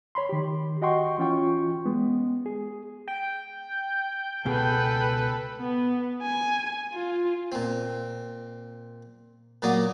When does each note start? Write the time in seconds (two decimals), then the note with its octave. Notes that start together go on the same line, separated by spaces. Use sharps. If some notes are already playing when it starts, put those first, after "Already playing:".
0.15 C#5 B5 C6
0.29 D#3 G4
0.82 F#4 D#5 F#5 G5 C6 C#6
1.18 E3 C#4 F4 G5 C#6
1.85 G#3 B3
2.46 G#4
3.08 G5
4.45 C#2 B2 G#4 A4 B4
5.58 B3
6.23 G#5
6.93 F4
7.52 A#2 C4
9.62 A#2 F#3 A#3 D5 F#5 D#6